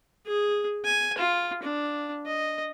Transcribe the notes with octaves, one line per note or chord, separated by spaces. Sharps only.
G#4
G#5
F4
D4
D#5